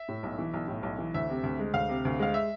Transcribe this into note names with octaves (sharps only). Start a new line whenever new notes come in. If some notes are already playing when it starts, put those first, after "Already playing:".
Already playing: E5
A2
B1
E3
B1
A2
B1
E3
D2 E5
C3
D2
G#3
D2 F5
C3
D2
G#3 F5
E5